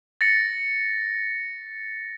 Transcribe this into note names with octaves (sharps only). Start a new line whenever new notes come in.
A6 A#6 C#7